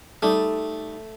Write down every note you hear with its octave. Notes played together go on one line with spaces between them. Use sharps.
G3 A3 D#4 A4